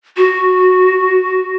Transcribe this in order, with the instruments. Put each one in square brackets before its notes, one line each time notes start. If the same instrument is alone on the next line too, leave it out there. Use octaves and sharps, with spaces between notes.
[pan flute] F#4